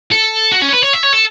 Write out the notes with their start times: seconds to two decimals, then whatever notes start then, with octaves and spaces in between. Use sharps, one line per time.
0.12 A4
0.52 F#4
0.62 C#4
0.69 C#5
0.73 B4
0.83 C#5
0.93 E5
1.03 C#5
1.13 A4